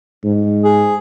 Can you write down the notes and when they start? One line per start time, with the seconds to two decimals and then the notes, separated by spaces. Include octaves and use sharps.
0.24 G#2
0.64 G#4